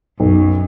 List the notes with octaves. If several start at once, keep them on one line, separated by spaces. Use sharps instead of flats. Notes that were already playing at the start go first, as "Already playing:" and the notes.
B1 F#2